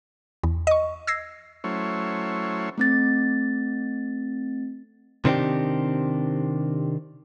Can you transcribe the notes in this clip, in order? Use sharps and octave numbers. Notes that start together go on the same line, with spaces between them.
E2
D#5 C#6
E6 G#6 A#6 C7
F#3 A3 C#4 E4 C5 C#5
A3 C4 A6
C3 D#3 C4 D4 G4